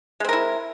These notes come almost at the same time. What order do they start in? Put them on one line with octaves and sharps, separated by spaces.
G#3 C4 A#4 E4